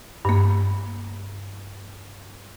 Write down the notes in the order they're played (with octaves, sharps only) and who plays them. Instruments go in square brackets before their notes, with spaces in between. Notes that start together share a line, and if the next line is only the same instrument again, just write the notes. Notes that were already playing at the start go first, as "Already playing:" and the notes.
[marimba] G2 A#3